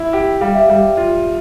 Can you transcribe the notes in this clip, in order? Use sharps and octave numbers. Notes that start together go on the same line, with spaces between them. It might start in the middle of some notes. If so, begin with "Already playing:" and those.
Already playing: E4
G4
G3 F5
E5
G3 F5
F4